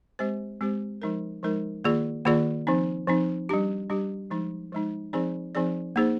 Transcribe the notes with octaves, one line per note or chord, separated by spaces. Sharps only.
G#3 C4 G4 C5
G#3 C4 G4 C5
F3 G#3 D#4 A#4
F3 G#3 D#4 A#4
D#3 A#3 F4 G#4 D5
D#3 A#3 F4 G#4 D5
F3 C4 D#4
F3 C4 D#4
G3 D4 G4
G3 D4 G4
F3 G#3 D#4
F3 G#3 D#4
F3 C4 D#4 G#4 D5
F3 C4 D#4 G#4 D5
A#3 D#4 G#4 C5